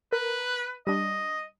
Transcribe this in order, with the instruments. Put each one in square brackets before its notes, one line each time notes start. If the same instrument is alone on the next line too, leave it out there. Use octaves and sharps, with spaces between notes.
[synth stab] A#4 [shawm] B4
[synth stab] G3 D4 [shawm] D#5